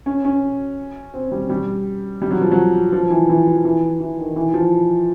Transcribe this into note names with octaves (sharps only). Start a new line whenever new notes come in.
C#4
C#4
C4
G3
G3
G3
F#3
F3
F#3
F3
E3
E3
F3
E3
E3
D#3
E3
F3